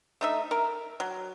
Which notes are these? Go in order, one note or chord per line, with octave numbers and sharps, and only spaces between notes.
A3 D#4 E5
A#4
F#3